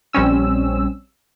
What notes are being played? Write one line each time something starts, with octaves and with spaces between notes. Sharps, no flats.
A#1 G3 C4 C#4 E6